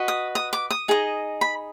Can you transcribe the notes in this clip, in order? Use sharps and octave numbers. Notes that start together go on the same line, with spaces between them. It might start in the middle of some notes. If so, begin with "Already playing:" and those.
Already playing: F#4 B4 D#5
D#6
D#6
D6
D#6
D#4 G#4 C5 D#5
B5